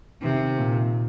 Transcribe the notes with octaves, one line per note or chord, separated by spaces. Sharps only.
C3 D#3
A#2